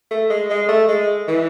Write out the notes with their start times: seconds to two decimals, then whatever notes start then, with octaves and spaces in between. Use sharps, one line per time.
0.11 A3
0.30 G#3
0.50 G#3
0.69 A3
0.88 G#3
1.28 E3